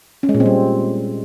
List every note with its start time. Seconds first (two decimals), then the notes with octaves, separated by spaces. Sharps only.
0.23 C#4
0.29 G#3
0.34 A#2
0.40 C4
0.46 G3